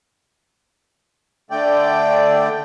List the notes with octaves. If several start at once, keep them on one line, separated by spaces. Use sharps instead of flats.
D3 A3 D5 G5